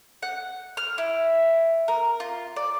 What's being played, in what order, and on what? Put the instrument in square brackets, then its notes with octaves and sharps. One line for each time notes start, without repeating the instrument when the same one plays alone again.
[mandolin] F#5
F6
E4
A#4
F4
D5